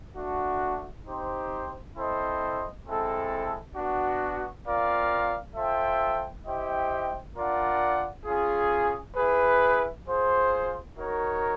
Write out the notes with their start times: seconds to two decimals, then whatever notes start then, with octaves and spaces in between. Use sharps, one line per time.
0.15 A3 D4 F#4
1.06 C4 D#4 G4 C5
1.96 C4 E4 A4 C5 D#5
2.86 G#3 C4 E4 A4
3.76 B3 D4 F#4
4.66 C4 F4 A#4 D5 F5
5.55 F4 A4 C5 E5 G5
6.46 E4 G4 C5 D#5 G5
7.36 D4 F4 A#4 D5 F#5
8.26 C#4 F4 G#4
9.16 E4 G#4 B4
10.07 F4 G#4 C5
10.96 D#4 F#4 A#4 C#5